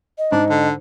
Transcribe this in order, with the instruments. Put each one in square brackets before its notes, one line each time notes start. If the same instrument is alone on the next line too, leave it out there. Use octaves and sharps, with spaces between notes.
[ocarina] D#5
[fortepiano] G#2 [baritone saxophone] D4
[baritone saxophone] D3